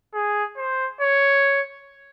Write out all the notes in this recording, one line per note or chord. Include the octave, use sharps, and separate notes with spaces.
G#4
C5
C#5